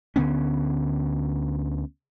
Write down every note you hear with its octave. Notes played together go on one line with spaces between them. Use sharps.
D2 D3 B3 C#4